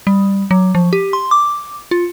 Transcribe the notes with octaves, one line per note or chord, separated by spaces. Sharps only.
G3
F#3
F3
G4
C6
D6
F4